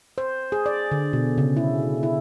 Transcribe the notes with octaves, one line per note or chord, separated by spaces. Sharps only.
C5
G#4
D5
D3
B2
C#3
E4
E4